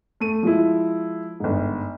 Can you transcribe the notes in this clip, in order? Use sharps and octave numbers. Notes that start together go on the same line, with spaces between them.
A3 D#7
F3 G#3 E4
G1 G#2